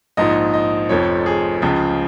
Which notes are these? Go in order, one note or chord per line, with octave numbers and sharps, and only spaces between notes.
A#1 G#2 F3 D#5
D#5
F1 F2 F3 C#5
G#4
C#2 C#3 F3 G#4